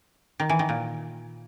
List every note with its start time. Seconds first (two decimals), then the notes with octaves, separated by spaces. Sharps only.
0.40 D#3
0.49 E3
0.59 D#3
0.69 A#2